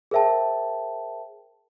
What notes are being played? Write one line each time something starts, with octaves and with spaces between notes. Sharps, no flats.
G#4 A#4 C5 E5 G5 A5